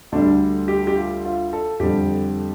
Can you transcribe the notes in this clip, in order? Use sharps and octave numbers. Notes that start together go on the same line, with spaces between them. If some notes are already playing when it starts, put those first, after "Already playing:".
D2 D3 G3 D4
G4
G4
F4
F4
A4
F2 D3 G3 G4